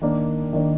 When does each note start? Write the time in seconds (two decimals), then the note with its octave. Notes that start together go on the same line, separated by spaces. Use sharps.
0.01 D#3 A#3 D4
0.53 D#3 A#3 D4